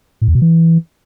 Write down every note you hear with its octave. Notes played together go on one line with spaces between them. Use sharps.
A2
E2
B2
E3